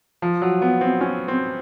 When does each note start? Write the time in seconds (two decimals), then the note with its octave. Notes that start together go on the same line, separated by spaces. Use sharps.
0.22 F3
0.42 F#3
0.62 B3
0.81 C4
1.01 C#4
1.28 C4